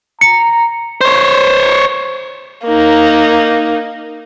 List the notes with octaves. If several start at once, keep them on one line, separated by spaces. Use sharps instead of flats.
A#5 C#7
C5 C#5
A#3 D#4